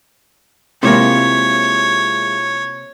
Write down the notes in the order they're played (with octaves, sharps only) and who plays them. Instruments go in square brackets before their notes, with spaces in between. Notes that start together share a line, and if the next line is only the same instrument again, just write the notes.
[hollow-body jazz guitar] C3 A#3 [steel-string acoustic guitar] G#3 E4 F4 [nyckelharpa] C#5